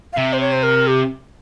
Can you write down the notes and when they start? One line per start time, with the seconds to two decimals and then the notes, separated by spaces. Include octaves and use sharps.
0.13 F5
0.17 C3 E5
0.33 C5
0.41 C#5
0.53 C5
0.63 A#4
0.87 G4